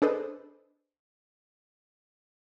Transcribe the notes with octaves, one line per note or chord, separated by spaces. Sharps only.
D4 G#4 A4 B4 C5 D#5